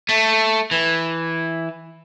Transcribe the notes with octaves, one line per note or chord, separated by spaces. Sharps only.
A3
E3